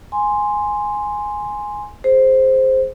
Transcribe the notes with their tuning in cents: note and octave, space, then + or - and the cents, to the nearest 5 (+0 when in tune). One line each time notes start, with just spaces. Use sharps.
G#5 +0 C6 +0
G#4 +0 C5 +0